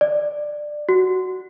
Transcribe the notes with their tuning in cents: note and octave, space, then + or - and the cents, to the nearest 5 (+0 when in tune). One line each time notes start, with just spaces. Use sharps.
D5 +15
F#4 +5